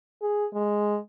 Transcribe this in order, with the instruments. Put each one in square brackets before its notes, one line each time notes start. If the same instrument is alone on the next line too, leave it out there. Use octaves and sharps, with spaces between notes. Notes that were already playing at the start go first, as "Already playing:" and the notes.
[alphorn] G#4
G#3